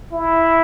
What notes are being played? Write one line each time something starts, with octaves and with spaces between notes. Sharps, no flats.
E4